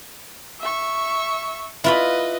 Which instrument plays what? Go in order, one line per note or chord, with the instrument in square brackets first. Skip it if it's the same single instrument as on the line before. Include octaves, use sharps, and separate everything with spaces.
[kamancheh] E5 C#6
[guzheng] E4 F4 B5 [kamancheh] B4 D#5